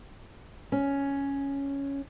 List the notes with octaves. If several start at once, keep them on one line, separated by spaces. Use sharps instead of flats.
C#4